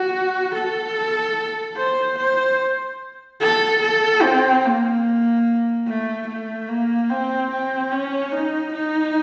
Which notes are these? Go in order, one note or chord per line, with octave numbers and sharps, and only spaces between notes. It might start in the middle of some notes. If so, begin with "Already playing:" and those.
Already playing: F#4
A4
C5
C5
A4
A4
C4
A#3
A3
A3
A#3
C4
C4
C#4
D#4
D#4